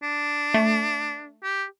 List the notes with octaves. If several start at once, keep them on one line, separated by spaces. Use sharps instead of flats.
D4
A3
G4